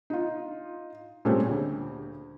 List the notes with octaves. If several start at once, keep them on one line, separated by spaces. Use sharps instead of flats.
D#4 F4
A#2 G3 A3 C4 C#4 G#4
D2